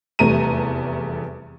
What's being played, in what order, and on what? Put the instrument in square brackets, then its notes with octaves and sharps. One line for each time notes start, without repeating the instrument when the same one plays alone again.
[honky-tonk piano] F1 E2 G3 A3 A#5 D#7